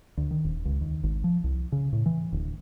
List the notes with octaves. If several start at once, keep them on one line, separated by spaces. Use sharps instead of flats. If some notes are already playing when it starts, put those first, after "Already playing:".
D2
D#3
D#1
C#2
D#2
G#1
F3
C2
C#3
A2
E3
D1